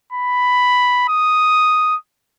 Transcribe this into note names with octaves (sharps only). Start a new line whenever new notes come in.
B5
D#6